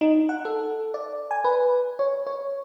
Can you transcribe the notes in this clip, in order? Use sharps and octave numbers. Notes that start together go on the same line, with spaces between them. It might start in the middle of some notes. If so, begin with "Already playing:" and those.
D#4
F#5
A4
D5
G#5
B4
C#5
C#5